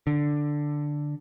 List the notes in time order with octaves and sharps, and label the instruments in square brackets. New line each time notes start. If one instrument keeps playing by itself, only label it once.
[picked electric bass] D3